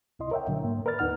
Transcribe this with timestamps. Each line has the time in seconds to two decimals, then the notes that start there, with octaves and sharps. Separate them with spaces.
0.19 C#2 C3 E4 D#5 C6
0.31 A#4 C#5 E5 F#5 G5
0.47 A#2 D3 F#3
0.64 G#2 A#3
0.86 A#4 B4 D5 F6 A6
0.99 D2 B3 D#4 F#5 F6